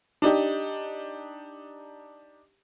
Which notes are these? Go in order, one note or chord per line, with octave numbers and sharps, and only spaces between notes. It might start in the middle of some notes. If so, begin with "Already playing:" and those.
D4 D#4 G4